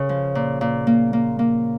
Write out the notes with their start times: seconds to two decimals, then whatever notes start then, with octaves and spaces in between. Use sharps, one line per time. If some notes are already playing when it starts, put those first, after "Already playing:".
Already playing: C#3 A#4
0.09 F3
0.35 A#2
0.61 A#2
0.87 A#3
1.13 A#3
1.39 A#3